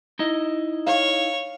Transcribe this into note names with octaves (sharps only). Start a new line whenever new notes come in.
D#4 E4 D#5
C#5 F5